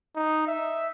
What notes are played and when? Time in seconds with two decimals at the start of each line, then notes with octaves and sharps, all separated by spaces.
0.16 D#4
0.47 E5